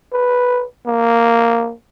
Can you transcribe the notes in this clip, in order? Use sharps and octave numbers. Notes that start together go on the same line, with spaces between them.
B4
A#3